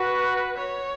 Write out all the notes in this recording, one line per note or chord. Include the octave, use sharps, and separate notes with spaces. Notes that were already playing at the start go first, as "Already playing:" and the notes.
Already playing: F#4 B4
C#5